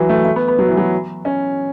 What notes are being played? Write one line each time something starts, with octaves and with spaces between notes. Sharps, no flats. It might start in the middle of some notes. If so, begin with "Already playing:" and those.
Already playing: E3 F#3
A3
A3
B3
B3
F#3
E3
F#3
C#4